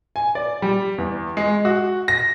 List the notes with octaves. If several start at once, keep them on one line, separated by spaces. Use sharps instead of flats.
G#5
D5
G3
E2
G#3
F#4
A#6